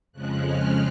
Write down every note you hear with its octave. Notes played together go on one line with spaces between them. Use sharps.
F2 C#3 F3 G#3 F#6
F6